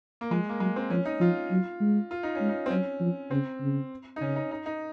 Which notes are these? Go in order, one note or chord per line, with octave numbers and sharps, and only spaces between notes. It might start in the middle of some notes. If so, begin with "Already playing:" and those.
A#3
F3 G#3
A#3
F#3 G#3
C4
F3 C#4
D#4
F3 F4
F#3
G#3
F4
D#4
C#4
G#3
D#4
C4
F#3 C#4
F3
C#3 C4
C#3
D#4
C#3 C#4
D#4
D#4
D#4